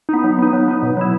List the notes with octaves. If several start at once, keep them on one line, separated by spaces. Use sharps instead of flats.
B3 D#4
F#3
B3 D#4
F#3
B3 D#4
B2
F#3 B3 E4